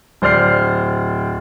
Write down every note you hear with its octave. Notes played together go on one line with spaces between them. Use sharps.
D1 C5 D5 F6 C7